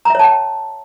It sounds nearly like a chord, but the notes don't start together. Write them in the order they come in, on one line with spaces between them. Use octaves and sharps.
A#5 E5 C#5 A5 G5